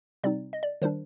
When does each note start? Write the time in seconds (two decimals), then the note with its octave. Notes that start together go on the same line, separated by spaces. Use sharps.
0.24 C3 G3 C4 D#4 D5
0.53 D#5
0.63 D5
0.82 D#3 G3 D4 C5